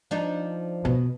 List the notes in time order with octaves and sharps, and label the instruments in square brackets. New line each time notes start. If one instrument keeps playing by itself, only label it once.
[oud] F3 D4 D#4
[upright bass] B2